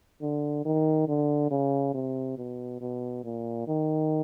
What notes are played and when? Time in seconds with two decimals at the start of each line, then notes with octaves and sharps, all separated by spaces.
0.22 D3
0.65 D#3
1.08 D3
1.51 C#3
1.94 C3
2.38 B2
2.81 B2
3.24 A#2
3.67 D#3